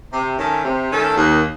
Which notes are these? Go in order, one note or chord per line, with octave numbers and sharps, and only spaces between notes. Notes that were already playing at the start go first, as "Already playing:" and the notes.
C3
D#3 A3 C#4 A4
C3
D#3 A3 C#4 A4
D#2